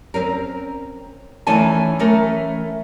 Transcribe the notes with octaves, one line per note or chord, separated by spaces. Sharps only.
C4 C#4 A#4
D#3 E3 A3 C#4 G#5 A5
E3 A3 C#4 A#4